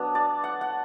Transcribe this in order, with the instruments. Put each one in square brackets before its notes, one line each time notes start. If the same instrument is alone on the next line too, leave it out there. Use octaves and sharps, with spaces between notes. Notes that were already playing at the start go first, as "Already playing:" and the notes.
Already playing: [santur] F#3 B3 D4
D5
F#5
F#5